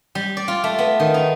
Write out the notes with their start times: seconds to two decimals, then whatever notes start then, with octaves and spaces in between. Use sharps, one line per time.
0.15 G3
0.37 D5
0.48 F4
0.64 A3
0.78 B3
1.00 D#3
1.14 D#4